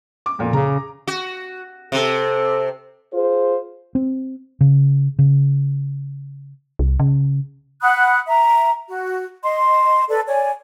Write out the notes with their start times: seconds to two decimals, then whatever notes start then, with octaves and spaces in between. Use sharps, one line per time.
0.26 D6
0.39 F2 A#2
0.53 C#3 A#5
1.08 F#4
1.92 C3 C4 A4
3.12 F4 G#4 C5
3.95 C4
4.61 C#3
5.19 C#3
6.79 C2
7.00 C#3
7.81 F#5 B5 D#6 F#6
8.27 E5 A#5
8.88 F#4
9.43 D#5 C6
10.09 A4 B4 D5
10.27 C#5 D5 G#5